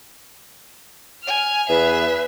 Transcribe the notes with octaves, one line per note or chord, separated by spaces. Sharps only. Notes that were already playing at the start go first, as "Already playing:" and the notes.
G#5 F6
E2 G#4 B4 E5